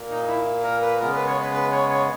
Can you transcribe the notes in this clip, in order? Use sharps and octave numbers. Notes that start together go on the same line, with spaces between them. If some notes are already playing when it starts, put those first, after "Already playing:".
Already playing: A#2 A#3
D#4
E4
A#4
B4
C#3 G#3 B3 A#4
B4
C#5
B4
B4
C#5
C#5